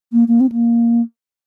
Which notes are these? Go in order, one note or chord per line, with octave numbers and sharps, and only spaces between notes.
A#3
A#3
C4
A#3